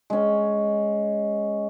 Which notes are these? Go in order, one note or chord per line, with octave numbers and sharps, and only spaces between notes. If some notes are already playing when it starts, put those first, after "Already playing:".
G#3 C#4